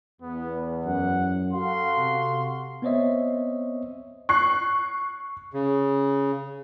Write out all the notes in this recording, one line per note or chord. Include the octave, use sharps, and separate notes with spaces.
E2 B3
F#2 F#5
F#4 A4 F5 C6
C3
B3 C4 C5 C#5 D#5 E5
C#6 F#6 C7
C#3